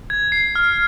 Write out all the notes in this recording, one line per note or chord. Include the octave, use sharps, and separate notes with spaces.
G#6
C7
F6